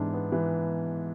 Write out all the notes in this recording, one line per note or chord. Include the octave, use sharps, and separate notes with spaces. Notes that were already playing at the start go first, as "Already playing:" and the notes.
Already playing: G#2 E3 D4
B3
E3